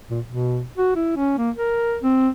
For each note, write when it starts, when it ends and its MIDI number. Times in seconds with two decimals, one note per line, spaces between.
0.10 0.20 46
0.26 0.63 47
0.78 0.91 66
0.96 1.16 64
1.16 1.37 61
1.38 1.50 58
1.56 1.98 70
2.03 2.29 60